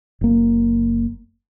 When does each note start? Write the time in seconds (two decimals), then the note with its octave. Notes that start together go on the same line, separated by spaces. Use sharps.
0.21 F#1 A#3